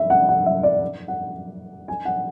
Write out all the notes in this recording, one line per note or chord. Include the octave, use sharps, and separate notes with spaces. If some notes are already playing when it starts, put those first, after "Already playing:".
Already playing: E5
F#5
F#5
E5
D5
F#5
G#5
F#5